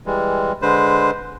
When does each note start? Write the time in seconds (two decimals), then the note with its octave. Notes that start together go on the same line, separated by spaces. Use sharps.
0.06 E3 G3 G#3
0.62 D3 G#3 B4 C5